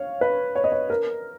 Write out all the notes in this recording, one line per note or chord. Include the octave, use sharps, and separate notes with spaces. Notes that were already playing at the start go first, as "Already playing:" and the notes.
Already playing: C#5 F5
B4
C#5
D#5
C#5
A#4